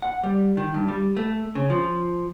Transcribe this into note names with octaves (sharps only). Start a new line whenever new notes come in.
F#5
G3
D#3
G2
G3
A3
C#3
F3